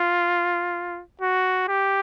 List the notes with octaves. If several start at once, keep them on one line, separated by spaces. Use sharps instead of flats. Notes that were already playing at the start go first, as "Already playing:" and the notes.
Already playing: F4
F#4
G4